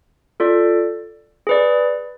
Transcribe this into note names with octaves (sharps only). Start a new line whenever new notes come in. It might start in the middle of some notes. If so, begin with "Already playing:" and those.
F4 A4 D5
G#4 B4 D5